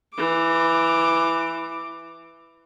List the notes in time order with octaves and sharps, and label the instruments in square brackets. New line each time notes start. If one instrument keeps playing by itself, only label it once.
[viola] E3 D6